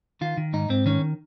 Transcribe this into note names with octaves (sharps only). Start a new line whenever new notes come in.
D#3 F4
D#3
G#2 D#4
G#2 C4
D#3 C#4